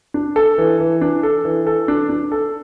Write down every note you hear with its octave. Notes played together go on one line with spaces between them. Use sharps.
D4
A4
E3
E3
D4
A4
E3
A4
D4
D4
A4